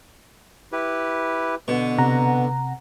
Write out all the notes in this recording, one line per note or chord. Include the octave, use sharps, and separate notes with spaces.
E4 G4 B4
B2 D3
C3 F#5 A#5